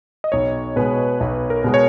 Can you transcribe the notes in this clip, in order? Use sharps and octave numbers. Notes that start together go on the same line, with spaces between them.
D#5
B1 C#5
B2 G#3 B4
B1
A#4
B2 G#3
C#5